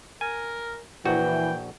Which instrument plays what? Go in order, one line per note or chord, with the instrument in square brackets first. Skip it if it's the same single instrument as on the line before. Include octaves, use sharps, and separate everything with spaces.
[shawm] A#4 [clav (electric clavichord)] G#5
[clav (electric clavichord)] A#1 F#4 [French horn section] E3 [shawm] G5